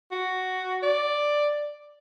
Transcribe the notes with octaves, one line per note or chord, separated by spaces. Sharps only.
F#4
D5